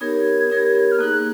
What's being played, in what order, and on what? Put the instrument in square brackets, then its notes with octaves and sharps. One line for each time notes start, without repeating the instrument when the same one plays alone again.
[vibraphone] B3 D#4 G4 A#4 C#5 [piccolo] G#6
[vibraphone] B3 D#4 G4 A#4 C#5
[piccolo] F6
[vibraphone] A#3 D#4 G#4 [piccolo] F#6